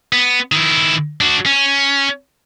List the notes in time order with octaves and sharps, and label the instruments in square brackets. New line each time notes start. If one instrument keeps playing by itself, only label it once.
[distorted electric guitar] B3
D#3 E4
D4 F#4
C#4